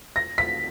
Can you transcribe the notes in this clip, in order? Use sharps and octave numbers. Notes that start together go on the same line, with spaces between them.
A#6
B6